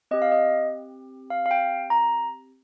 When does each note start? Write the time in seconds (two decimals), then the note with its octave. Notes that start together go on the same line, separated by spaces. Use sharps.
0.11 C4 G4 D#5
0.22 F5
0.32 D#5
1.30 F5
1.46 F5
1.51 G5
1.90 A#5